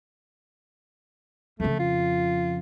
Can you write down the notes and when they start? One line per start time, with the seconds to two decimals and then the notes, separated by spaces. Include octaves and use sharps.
1.60 F2 C#3 A3
1.79 F4